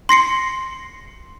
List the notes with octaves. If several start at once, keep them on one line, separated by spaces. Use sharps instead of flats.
C6 A#6 C7 C#7